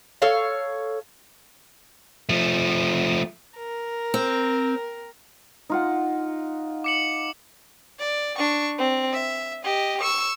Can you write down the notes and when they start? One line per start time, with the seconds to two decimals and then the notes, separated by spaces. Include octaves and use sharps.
0.22 A4 C#5 F5
2.29 F3 A3
3.57 A#4
4.14 C4
5.70 D#4 F4 F#5
6.84 D6 C#7 F#7
7.99 D5
8.38 D4 C#6
8.78 C4
9.13 E5
9.64 G4 D#5
10.01 C#6 E6